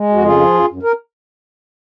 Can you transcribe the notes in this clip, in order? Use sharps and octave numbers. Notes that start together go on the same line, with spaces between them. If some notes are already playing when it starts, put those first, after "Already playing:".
Already playing: G#3
F2 F#4
C#3 F4 G#4
F3
F#2
F#2
A#4